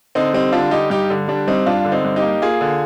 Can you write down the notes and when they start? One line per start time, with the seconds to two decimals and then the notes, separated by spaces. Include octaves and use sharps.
0.15 D3 C4 D#4
0.33 G3 C4 D#4
0.52 D3 D4 F4
0.71 G3 D#4 G4
0.90 G2 D#4 G4
1.10 D3
1.28 G3 D4
1.47 G2 C4 D#4
1.66 G2 D4 F4
1.85 D3
1.92 C4 D#4
2.05 G2
2.16 D#4 G4
2.23 A#3
2.42 A#3 F4 G#4
2.61 D3